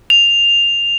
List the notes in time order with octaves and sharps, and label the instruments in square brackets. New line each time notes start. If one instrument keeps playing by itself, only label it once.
[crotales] F7